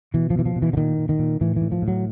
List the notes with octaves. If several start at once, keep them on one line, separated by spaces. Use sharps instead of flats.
B2 E3
F3
B2 E3
F3
B2
E3
D3
A#2 D#3
A#2
D#3
A#2
A2 E3
A2 E3
F3
A2
F#3